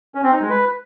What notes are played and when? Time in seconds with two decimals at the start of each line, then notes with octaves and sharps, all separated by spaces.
0.15 C#4
0.24 C4
0.32 D#4
0.41 G#3
0.50 B4